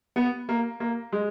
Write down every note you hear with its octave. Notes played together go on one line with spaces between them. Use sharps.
B3
A#3
A#3
G#3